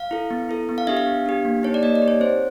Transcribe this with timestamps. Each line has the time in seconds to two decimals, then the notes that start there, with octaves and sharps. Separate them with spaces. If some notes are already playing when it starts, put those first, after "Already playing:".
Already playing: F5
0.11 E4 A4
0.30 B3
0.49 E4 A4
0.69 B3
0.78 F5
0.87 D4 G4 E5
0.97 F5
1.07 B3
1.26 D4 G4
1.45 A#3
1.63 D#4 G4 C#5
1.74 D5
1.83 A#3 D#5
1.95 D5
2.01 D#4 G4
2.08 C#5
2.20 C4 C5